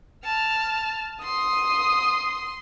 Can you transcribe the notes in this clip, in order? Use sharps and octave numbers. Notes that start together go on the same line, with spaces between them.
A5 F6
C6 D#6